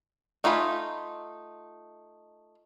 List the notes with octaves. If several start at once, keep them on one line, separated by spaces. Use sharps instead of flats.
A3 D#4 F4 G#5 B5